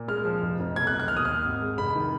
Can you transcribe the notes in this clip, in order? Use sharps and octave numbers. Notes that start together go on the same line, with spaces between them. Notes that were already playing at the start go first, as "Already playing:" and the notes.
Already playing: A#2
G#3 F6
F3
F1
F1
B1 G#6
F#6
B1
F#6
D#2 F6
D#6
D#2 F6
G#1
G#3
F1 B5
D#3